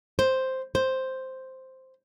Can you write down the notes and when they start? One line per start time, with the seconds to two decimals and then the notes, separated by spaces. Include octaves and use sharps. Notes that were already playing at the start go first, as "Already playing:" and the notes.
0.19 C5
0.75 C5